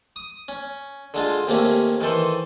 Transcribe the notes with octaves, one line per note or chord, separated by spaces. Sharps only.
D#6
C#4
D3 G#3 F4
D#2 C3 A3 A#3 C#4
D#3 E3 A4 C5